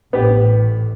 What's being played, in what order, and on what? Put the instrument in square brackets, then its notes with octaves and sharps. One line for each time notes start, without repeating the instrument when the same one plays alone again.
[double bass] A1 A2 [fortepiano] B3 G4